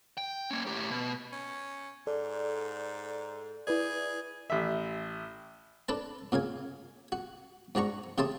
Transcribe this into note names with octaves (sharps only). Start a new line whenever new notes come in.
G5
A#3 C#4
A2 G4
B2
C#4
G#2 A4 D5
E4 G#4 B4 D5
A1 E5
D4 A4 B4 A5
A#2 C#3 F5 G#5
F#4
G#2 D4 F#4 A#5 C#6
C#3 G4 E5 A5 C6 D#6